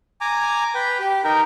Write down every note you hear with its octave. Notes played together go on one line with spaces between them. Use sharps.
G#5 A#5 D6
B4 G5
G4
D#4 A#4 G5